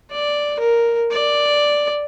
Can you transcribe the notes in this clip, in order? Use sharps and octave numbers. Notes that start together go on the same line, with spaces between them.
D5
A#4
D5